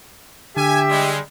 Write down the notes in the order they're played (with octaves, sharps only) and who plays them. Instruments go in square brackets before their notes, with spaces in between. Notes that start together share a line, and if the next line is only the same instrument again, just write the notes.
[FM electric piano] D3 [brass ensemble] G4 E5 [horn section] G#5
[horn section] G3 G#3